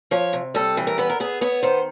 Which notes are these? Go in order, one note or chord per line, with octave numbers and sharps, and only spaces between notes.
F3 C#5
C3
G3 A4
E3
A#4
B3 B4
A#4
B3 G#4
B3 C#5
D#3 C5